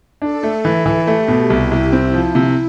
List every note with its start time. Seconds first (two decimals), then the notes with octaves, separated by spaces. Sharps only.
0.21 D4 A4
0.43 A3
0.65 E3
0.86 E3
1.07 A3 G4
1.28 B2
1.50 C2 E4
1.71 C2
1.92 C4 E4
2.14 F3
2.35 C3